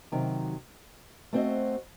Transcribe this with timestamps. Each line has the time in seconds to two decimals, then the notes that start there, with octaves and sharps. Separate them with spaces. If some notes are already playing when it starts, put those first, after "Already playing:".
0.12 C3 D#3 F#3
1.33 A3 C4 F#4 C5 D#5